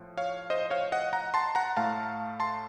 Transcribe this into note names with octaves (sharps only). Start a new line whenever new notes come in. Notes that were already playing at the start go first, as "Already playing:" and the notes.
Already playing: A2 F3
C#5 F5
C5 D#5
C#5 F5
D#5 F#5
F#5 A#5
A5 C6
F#5 A#5
A2 A3 F5 A5
A5 C6